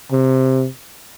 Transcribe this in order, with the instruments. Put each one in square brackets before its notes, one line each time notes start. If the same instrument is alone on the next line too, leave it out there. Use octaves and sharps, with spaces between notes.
[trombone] C3